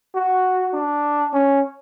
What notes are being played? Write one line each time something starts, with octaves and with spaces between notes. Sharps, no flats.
F#4
D4
C#4